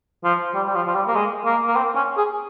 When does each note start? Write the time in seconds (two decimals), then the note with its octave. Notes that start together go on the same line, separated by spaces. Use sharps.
0.24 F3
0.55 G3
0.68 G3
0.75 F3
0.87 F3
0.95 G3
1.08 A#3
1.15 G#3
1.46 A#3
1.67 A#3
1.76 C4
1.96 C#4
2.17 G#4